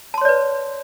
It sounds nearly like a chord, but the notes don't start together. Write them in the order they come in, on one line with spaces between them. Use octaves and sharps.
A5 C6 C#5 D5 B4